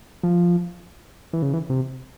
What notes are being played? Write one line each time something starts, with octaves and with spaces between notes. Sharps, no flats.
F3
E3
C#3
E3
C3